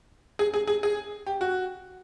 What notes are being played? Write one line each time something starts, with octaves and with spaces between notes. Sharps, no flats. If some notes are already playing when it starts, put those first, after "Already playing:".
G#4
G#4
G#4
G#4
G4
F#4